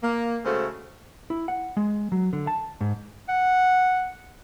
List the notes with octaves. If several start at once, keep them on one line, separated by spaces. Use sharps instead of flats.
A#3
C#3 G#3 A3 F#4 A4 C5
E4
F#5
G#3
F#3
D3
A5
G#2
F#5